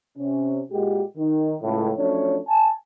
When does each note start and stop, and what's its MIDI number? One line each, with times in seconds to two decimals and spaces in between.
0.18 0.61 48
0.18 0.61 61
0.71 1.02 46
0.71 1.02 56
0.71 1.02 66
0.71 1.02 67
1.18 1.55 51
1.62 1.91 37
1.62 1.91 45
1.97 2.39 53
1.97 2.39 54
1.97 2.39 57
1.97 2.39 61
1.97 2.39 62
1.97 2.39 73
2.48 2.70 80
2.48 2.70 81